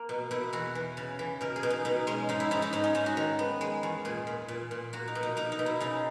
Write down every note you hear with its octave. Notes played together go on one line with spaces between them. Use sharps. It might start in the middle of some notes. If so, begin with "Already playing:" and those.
Already playing: A#3
B2
B2 E4
E2 F#4
E3
C#3
E3
B2 A#4
G#4
B2
D#4
B2 D#4
G#3 C#4
G#2 D#4
E4
G#2 D#4
D#4
G#2 D#4
C#4
G#2 D#4
F#4
D#3
B3
G#3
E2
A#2 G#4
A#2
A#2
A#2
A#3 F#4
D#4
B2
D#4
A#3 D#4
D#4
B2
E4
C#3 D#4